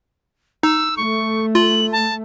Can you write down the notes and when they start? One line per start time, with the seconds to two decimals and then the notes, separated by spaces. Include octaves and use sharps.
0.63 D#4 E6
0.97 A3 C#6
1.55 F4 F#7
1.92 A5